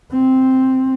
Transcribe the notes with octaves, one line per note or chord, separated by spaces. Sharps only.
C4